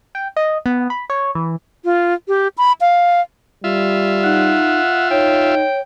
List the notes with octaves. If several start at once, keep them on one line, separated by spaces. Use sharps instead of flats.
G5
D#5
B3
B5
C#5
E3
F4
G4
B5
F5
G3 F4 E5
D#4 F#5
D#4 C#5 G5